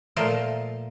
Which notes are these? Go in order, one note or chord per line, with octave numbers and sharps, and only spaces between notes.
A#2 F3 A3 A#4 C5